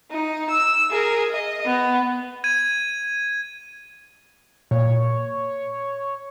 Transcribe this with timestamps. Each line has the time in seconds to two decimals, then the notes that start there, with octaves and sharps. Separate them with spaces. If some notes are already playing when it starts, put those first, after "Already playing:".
0.10 D#4
0.50 E6
0.91 G#4 A#4
1.31 D#5
1.66 B3
2.44 G#6 D#7
4.71 A#2 C#5